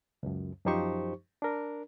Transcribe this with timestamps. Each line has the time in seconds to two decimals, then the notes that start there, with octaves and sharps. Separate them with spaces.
0.23 C#2 F#2
0.66 F#2 F3 D#4 G4 C5 C#6
1.42 D4 A#4